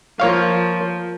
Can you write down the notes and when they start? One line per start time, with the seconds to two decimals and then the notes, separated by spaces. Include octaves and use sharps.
0.20 F3 A#3 C#5 F5